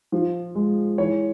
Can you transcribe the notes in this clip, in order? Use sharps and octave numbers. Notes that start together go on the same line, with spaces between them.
F3
G#3
E3 C#5